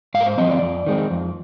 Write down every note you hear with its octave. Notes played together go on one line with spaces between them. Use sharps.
G#2 F5
A#4
C5
F3 G#3 C4 D#5
D5
F2
D#3 G#3 C4
F2